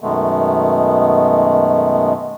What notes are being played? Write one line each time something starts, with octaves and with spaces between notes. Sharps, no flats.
F#2 B2 D#3 G#3 A3 B3